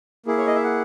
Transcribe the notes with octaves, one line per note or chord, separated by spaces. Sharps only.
A#3 E4 G#4
C#5
D#5
E5
F#5